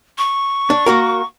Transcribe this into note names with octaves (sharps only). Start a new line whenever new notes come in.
C#6
D4
A#3 F#4 A#4